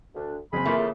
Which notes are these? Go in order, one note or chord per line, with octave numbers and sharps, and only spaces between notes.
D2 D4
F#1 C4 G#4 B5
E3 F3 A3 A#3 F4 A#4
C#3